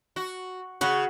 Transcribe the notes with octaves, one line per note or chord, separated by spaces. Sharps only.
F#4
C#3 F#4 F#5